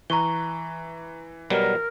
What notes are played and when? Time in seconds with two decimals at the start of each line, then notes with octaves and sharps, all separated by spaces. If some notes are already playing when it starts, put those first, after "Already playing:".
0.10 E3 B4 A#5 C#6 G7
1.50 B2 F#3 G3 A#4